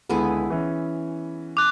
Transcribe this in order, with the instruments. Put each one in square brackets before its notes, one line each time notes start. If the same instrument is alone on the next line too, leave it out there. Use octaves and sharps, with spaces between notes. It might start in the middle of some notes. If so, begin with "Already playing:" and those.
[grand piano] C#2 D3 [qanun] B3 E4 G#4
[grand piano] E3 C#4
[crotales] D6 F#6